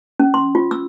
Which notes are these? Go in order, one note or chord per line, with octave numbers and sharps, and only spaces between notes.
C#4
C6
F4
E6